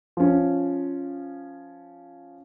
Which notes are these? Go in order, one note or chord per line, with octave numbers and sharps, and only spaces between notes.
F3 C#4